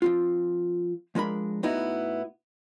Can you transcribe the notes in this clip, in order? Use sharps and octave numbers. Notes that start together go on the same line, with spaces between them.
F3 C4 F4
F3 G#3 D4 A#4 B5
A2 B3 D#4 E4 F#4